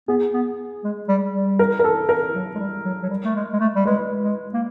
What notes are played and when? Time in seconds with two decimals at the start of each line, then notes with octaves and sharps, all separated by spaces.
0.08 B3 G#4
0.33 B3
0.84 G#3
1.09 G3
1.34 G3
1.59 A#4
1.79 A#4
1.84 A4
2.09 A#4
2.35 F#3
2.55 G#3
2.60 G3
2.85 F#3
3.03 F#3
3.10 G3
3.24 A3
3.35 G#3
3.53 G#3
3.60 A3
3.76 G3
3.85 G#3 B4
4.24 G#3
4.54 A#3